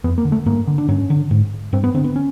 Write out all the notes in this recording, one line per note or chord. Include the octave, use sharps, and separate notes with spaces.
F2 B3
A#3
D3
A3
G2 A#3
D3
D4
G2 C#4
D3
G#2
G2 C4
B3
D3 C4
B3
C#4